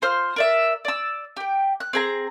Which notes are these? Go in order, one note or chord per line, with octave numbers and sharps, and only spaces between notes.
F4 C5 F6
A#4 D5 E5
D5 E6
G4 G5
F#6
C4 G#4 A#5